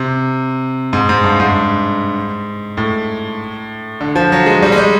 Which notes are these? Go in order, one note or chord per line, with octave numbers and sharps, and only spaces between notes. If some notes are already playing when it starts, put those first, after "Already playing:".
Already playing: C3
G#2
G#2
G2
G#2
A2
D3
F3
F#3
G#3
G3
G#3
G3